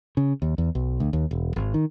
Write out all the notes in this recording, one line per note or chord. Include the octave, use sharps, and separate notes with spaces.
C#3
D#2
E2
B1
D2
D#2
E1
G#1
D#3